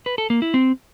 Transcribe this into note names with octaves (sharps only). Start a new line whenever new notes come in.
B4
A4
A#3
E4
C4